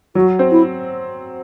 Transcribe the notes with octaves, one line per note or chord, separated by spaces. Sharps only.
F#3 F#4
C4
E4